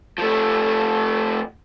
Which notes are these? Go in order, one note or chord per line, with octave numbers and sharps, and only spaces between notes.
F3 A3